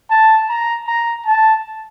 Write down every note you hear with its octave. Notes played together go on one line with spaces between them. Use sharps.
A5
A#5
A#5
A5